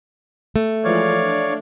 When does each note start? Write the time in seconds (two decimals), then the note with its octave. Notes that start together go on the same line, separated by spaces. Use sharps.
0.56 A3
0.84 E3 F3 G#3 C#5 D5 F5
1.22 D4